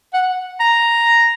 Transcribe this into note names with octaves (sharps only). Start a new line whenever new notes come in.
F#5
A#5